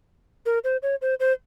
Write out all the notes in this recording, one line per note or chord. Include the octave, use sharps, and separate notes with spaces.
A#4
C5
C#5
C5
C5